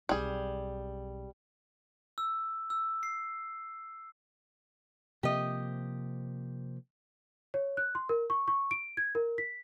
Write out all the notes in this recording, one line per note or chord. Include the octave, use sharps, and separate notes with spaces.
B1 G3 C4 G#4
E6
E6
C7
C3 F3 A#3 G4 D#5
C#5
F#6
C6
A#4
C#6
C#6
D7
G#6
A#4
B6